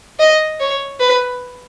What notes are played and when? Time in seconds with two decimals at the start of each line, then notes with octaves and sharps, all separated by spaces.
0.19 D#5
0.60 C#5
1.00 B4